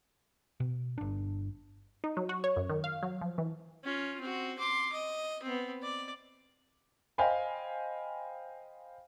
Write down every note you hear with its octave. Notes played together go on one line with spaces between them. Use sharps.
B2
G1 D4
D#4
F#3
F#4
C#5
F#2
D#3
F5
F#3
F3
E3
C#4 F4
C4 F#4
C6 D6
D#5
B3 C4
D5
C5 D#5 F5 G5 G#5 B5